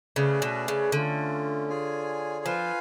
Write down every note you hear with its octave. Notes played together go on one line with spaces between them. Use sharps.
C#3 A3 C#4 G#4 B4 D5
B2
C#3
D3 A3 C#4 F4
F4 G#4 C#5 G#5
F3 F4 B4 F5 G#5